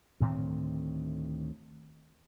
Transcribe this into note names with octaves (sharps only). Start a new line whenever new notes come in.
D2 A2 D#3 C4